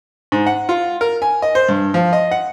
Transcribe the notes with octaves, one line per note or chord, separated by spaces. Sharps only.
G#2
F#5
F4
A#4
G#5
D#5
C5
G2
F3
D#5
F#5